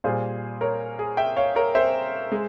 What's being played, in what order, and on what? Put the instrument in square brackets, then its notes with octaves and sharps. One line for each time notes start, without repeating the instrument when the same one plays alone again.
[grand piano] A#2 G3 G#4 C5
A#4 C#5
G#4
E5 G5
C#5 F5
A#4 C#5
C5 E5
G#3